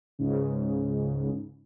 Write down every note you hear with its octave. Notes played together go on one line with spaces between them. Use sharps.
C#2 G#2 C#3